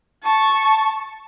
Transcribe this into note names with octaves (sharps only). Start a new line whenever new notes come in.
A5 C#6